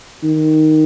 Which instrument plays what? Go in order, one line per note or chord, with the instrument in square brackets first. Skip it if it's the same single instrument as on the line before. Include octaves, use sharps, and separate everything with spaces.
[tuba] D#3